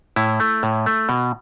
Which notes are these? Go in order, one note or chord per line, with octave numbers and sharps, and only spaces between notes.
A2 E4
A3
A2
A3
B2